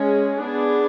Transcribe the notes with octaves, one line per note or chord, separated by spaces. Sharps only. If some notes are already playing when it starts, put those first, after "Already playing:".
Already playing: G#3 C#4 G#4
B3 D4 G#4